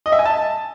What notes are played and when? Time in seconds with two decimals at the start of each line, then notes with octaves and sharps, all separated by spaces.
0.06 D#5
0.12 E5
0.19 G#5
0.26 A5